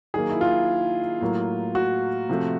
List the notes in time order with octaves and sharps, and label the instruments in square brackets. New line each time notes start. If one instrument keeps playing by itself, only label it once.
[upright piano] D#3 F#3 A#3 G#4
E4
F4
A2 F#3 A#3
F#4
C3 F3 A3